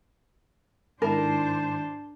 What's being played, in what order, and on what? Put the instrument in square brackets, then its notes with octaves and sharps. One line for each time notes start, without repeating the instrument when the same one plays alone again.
[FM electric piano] G#2 D#3 E4 [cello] D4 C5 [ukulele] A#4 [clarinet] A5